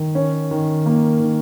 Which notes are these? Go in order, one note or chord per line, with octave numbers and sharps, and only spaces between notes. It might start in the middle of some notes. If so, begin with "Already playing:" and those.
Already playing: D#3
C#4
D#3
A#3
D#3